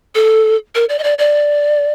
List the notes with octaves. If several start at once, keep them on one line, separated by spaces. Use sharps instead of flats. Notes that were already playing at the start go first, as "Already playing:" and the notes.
A4
A#4
D5
D#5
D5
D5